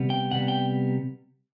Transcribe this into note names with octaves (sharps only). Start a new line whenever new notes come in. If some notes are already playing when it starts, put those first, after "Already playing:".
Already playing: C3 G3 B3
G5
C3 G3 B3 F#5
G5